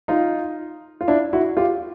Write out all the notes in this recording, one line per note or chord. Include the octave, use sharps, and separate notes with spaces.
D#4 F4
F4
D4 E4
E4 F#4
F4 G4